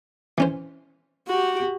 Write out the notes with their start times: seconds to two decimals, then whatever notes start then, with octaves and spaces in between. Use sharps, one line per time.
0.38 E3 C#4 C5
1.28 F#4 G4